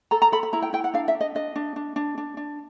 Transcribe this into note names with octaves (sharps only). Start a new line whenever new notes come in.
A4 A#5
A#5
A4 B5
B5
E4 A#5
G5
E4 G5
F#5
D4 F5
E5
D4
D#5
D4 D#5
D4
D4
D4
D4
D4